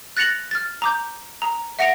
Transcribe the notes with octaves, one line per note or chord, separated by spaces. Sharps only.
F#6 A6 A#6 C#7 F7 F#7
F6 A6
A#5 D6 G6
A#5
E5 F#5 A#6 C#7 D7 F7